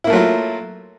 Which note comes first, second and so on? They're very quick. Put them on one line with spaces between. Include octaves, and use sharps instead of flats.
E4 A#3 A3 F#3 F4